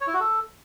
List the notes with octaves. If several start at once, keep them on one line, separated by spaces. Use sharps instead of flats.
C#5
E4
F#4
A4